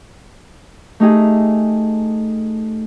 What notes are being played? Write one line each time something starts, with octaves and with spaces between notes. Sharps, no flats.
A3 D#4 G4 G#4